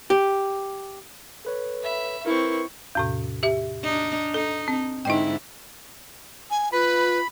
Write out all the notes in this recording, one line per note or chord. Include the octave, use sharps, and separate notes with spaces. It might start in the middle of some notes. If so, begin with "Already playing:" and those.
G4
A4 B4 C#5
E5 B5
C4 E4 A#4 B4 C#6
E2 A2 C3
G4 E5
D4 D#4
D#4 A4
C4
G#2 D3 D#4 E4 D#5 G5
G#5
F4 B4 B5